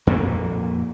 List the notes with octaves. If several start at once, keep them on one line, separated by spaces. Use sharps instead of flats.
F2 A#2 A#3